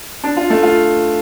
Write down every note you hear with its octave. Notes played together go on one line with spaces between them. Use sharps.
D4
F4
A3
F4